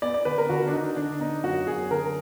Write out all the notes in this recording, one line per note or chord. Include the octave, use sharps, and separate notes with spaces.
B3 D5
D5
D3 B4
A#4
D3 F#4
D4
D3 D#4
D3 D4
B3 D#4
F#2 F#4
F#2 G#4
D3 A#4